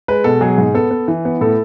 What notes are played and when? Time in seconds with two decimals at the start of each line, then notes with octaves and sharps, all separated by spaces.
0.08 G#3 B4
0.24 B2 A4
0.41 F#3 G#4
0.58 G#2
0.74 B3 A4
0.91 B3
1.08 E3
1.25 B3
1.41 A2 A4